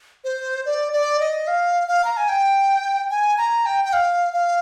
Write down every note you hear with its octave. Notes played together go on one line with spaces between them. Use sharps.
C5
D5
D5
D#5
F5
F5
A#5
G#5
G5
G#5
A#5
G5
G5
F5
F5